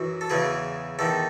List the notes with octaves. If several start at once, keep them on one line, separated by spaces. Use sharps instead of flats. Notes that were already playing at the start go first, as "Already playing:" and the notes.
Already playing: F#2 E3 F#4
A4
E2 C#3 E3 G#4
E2 D#3 A4